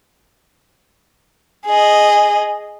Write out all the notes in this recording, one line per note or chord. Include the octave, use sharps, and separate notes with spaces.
G#4 D#5